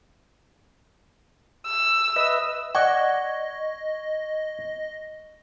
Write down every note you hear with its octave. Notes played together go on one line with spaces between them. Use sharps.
E6
B4 D#5 E5
D5 D#5 F#5 C#6 G#6